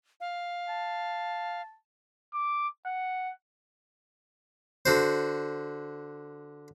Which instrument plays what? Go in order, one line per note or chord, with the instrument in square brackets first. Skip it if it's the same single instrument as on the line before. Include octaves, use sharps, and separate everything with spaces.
[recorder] F5
[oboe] A5
[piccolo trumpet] D6
F#5
[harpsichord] D3 F#4 C5